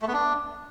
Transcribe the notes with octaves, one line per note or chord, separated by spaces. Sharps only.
A3
B3
D4